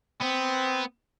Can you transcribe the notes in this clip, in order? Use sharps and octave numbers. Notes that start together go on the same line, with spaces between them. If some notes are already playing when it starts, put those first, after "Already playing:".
B3 C4